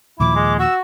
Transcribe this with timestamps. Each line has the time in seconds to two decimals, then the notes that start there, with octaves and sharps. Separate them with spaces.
0.20 D#2 A#2 F3 E4 D6
0.35 G#3
0.59 F#4 E6